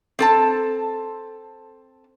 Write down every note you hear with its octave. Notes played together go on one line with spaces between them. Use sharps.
C4 A4 A5